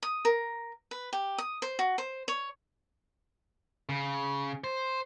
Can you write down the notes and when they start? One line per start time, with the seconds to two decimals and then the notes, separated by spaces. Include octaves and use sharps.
0.03 D#6
0.25 A#4
0.91 B4
1.13 G4
1.38 D#6
1.62 C5
1.79 F#4
1.98 C5
2.28 C#5
3.89 C#3
4.64 C5